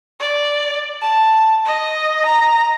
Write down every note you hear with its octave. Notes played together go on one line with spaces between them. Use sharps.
D5
A5
D#5
A#5